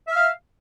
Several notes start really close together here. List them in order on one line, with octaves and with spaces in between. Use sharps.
E5 F6 F5